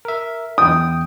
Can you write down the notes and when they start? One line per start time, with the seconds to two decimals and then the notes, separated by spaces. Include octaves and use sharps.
0.05 A#4 E5
0.58 E2 G5 D#6